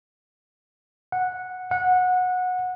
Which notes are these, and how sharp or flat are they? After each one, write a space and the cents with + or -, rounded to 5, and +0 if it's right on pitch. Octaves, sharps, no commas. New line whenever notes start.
F#5 -10
F#5 -20